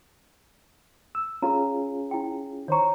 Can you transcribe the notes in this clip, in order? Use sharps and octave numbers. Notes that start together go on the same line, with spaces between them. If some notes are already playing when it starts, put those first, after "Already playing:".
E6
C#4 F4 G#4 A#5
E4 G5
D#3 C5 C#5 A#5 C#6